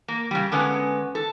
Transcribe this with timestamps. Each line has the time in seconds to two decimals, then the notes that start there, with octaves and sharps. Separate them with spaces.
0.08 A#3
0.31 C#3 G3
0.52 D3 G#3 B3 C#4
1.15 A4